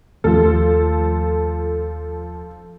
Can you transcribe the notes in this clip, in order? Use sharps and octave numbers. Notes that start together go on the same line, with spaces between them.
D#2 F3 A3 C#4 A4